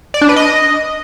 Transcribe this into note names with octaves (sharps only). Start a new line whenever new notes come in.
D5
D4
B4
D#5